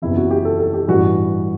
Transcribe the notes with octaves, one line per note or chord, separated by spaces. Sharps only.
F#1 E2 C3 E3 E4
F#4
G4
A4
A4
G4
A1 G2 E3 F#4